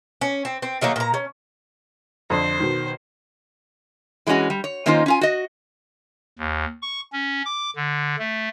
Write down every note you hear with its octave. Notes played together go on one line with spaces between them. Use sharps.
C#4
C4
C4
D#3 F#3 A3 A#3
A#2 A#5
C#4
F2 D3 C5
B2 D#3
E3 G#3 A3 C#4 F#4
G3
C#5
D#3 A#3 C#4 D#4 F4 C5
C#4 F4 G#5
F#4 D#5
D#2
C#6
C#4
D6
D3
A3